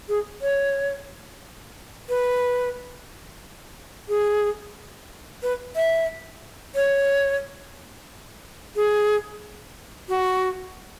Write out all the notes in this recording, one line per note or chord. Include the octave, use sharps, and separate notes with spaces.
G#4
C#5
B4
G#4
B4
E5
C#5
G#4
F#4